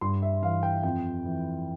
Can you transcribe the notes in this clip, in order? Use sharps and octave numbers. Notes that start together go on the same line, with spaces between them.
G2 C6
E5
E3 F5
G5
F2 G5
E3